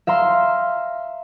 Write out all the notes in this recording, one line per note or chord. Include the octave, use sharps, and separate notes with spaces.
E5 F5 A#5 C6